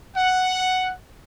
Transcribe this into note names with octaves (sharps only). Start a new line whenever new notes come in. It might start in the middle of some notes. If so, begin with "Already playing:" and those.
F#5